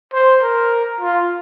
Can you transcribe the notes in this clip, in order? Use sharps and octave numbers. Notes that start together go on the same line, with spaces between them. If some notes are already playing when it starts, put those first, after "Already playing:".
C5
A#4
F4